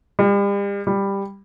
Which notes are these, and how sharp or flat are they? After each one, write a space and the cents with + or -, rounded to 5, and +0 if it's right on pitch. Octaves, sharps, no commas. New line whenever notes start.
G3 +40
G3 +10